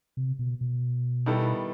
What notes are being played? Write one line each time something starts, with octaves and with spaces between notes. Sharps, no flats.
C3
B2
B2
D#3 G3 B3 E4 A4